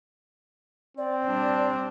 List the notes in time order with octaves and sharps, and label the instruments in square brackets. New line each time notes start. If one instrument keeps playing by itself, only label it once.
[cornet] C4 [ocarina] D5
[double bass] G3 D4